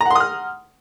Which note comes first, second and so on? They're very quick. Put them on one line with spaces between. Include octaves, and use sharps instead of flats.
A#5 F#5 C6 D#6 F6